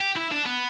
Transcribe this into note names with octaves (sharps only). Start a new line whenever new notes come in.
G4
E4
D4
B3